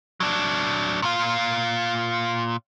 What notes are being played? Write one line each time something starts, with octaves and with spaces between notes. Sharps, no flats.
F#3 D4
A#2 F4